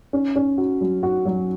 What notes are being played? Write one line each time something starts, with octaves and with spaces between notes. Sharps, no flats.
C#4
C#4
F#4
F#3
F#4
F#3